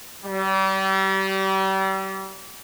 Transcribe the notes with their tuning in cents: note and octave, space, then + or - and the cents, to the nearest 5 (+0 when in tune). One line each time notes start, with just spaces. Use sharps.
G3 -35